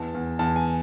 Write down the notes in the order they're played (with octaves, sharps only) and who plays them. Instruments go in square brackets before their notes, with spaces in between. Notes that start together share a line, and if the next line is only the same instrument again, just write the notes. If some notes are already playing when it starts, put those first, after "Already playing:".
Already playing: [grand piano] E2 E3 A5
E2
E2 A5
G#5